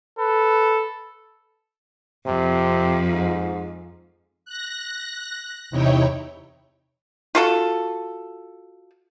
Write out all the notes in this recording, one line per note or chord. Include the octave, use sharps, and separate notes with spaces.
A4 B4
F2 C3
G#2
F#6 A#6
E2 C3 D#4 E4 C#5 G5
F4 F#4 A4